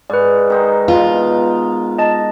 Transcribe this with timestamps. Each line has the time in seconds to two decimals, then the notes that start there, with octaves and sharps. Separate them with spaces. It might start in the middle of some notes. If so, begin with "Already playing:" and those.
0.10 G#2 B4 D5
0.50 D#3 D#4 C5
0.88 B2 F4
1.98 D#5 A5